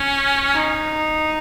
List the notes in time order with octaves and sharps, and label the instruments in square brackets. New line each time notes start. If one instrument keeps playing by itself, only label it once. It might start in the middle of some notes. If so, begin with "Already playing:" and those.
Already playing: [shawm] C#4
[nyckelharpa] D#4